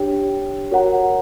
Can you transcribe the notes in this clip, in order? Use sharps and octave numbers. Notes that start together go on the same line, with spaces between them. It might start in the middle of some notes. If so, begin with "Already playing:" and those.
Already playing: D4 G4 C#5 G5
F#4 A#4 C#5 F#5 A#5